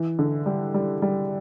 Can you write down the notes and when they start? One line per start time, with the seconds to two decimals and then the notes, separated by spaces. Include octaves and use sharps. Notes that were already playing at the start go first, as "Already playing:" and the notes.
Already playing: E3
0.19 D3
0.46 G3
0.74 G3
1.02 G3